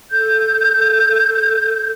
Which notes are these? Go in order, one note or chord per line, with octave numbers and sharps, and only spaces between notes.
A4 G6